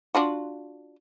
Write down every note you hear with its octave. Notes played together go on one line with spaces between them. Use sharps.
D4 F4 F#4